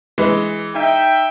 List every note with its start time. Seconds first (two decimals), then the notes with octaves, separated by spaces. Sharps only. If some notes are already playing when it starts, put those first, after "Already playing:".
0.18 E3 G#3 B4
0.75 D#4 E5 G5